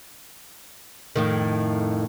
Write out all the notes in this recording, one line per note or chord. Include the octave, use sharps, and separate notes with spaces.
F2 A2 D#3